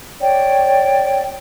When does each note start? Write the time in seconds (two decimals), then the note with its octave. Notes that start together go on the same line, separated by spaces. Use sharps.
0.20 C#5 D5 G5